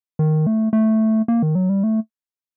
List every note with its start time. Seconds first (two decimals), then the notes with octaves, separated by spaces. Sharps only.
0.19 D#3
0.47 A3
0.73 A3
1.28 A#3
1.42 D#3
1.55 F#3
1.69 G3
1.84 A3